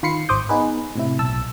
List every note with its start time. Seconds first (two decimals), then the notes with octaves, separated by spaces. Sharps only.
0.03 D#3 F4 B5 C7 C#7
0.29 G#1 C5 D6 D#6 G6
0.49 B3 D#4 G#4 B4
0.96 A2 C3 E4
1.19 B1 A5 E6